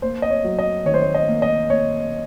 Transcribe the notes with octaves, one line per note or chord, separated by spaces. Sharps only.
A#3 C5
D#5
C#5
F#3
D#5
D#3 C#5
C5
C#5
D#5
A#3
D#5
A#3 C#5